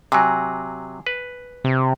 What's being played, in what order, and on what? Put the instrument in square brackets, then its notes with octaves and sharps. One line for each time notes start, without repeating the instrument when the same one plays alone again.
[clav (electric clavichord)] C3 F#3 [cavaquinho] G#4
[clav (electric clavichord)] B4
[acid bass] C3